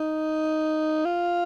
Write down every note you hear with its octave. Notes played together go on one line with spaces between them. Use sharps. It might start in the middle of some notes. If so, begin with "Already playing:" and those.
Already playing: D#4
F4